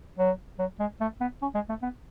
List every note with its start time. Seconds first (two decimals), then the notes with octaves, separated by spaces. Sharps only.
0.18 F#3
0.59 F#3
0.79 G#3
1.01 A3
1.20 B3
1.42 C#4
1.55 G#3
1.69 A3
1.82 B3